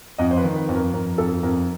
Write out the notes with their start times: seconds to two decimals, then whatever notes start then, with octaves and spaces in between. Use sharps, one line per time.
0.18 F2 D#5
0.31 C5
0.38 B4
0.43 D#3
0.56 B4
0.68 F2
0.75 A#4
0.93 F2 A#4
1.18 F2 A4
1.43 F2 A#4